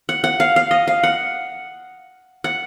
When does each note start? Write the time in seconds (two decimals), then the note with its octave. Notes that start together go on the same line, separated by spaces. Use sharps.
0.09 F#5
0.24 F#5
0.40 F5
0.56 F5
0.71 D#5
0.87 F5
1.03 F#5
2.44 F#5